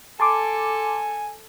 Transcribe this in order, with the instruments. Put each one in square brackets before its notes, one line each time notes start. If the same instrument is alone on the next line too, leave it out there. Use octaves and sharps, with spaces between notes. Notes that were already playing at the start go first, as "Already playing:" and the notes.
[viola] A4 [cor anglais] G#5 [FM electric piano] A5 C6 D6